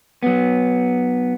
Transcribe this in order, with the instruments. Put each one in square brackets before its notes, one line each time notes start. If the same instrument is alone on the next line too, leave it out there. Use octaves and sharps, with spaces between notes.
[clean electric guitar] F#3 B3